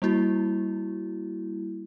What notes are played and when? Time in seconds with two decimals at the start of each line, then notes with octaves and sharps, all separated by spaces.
0.02 G3 A#3 E4 F#4